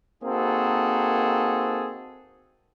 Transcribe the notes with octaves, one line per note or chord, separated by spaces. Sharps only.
A#3 C4 D#4 F#4 G#4 A4